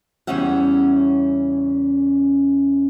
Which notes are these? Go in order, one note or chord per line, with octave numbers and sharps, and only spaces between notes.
E2 C#3 G3 C#4 E5 F#5